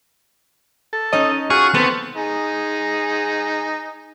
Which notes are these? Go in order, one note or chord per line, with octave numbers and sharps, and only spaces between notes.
A4
C#4 D#4 D#5
F4 F#4 G#4 C#6
B3 C4 A4 B4
D#4 G#4